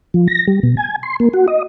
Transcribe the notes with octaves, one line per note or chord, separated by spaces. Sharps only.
F3
A#6
G3
B2
G#5
C6
A#3
F#4
D#5